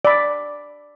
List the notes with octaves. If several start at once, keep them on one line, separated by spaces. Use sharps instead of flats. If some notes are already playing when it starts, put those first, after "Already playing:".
D5 B5